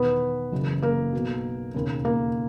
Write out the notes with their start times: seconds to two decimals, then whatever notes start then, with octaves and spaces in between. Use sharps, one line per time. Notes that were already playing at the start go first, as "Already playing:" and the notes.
Already playing: E1 E2 D#3 B3 B4
0.52 F#1 F#2 C#3 E3
0.82 A#3 A#4
1.13 B1 B2
1.74 E1 D#2 C#3
2.05 A#3 A#4